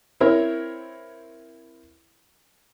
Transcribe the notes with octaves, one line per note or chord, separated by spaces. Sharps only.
C4 E4 A#4 C#5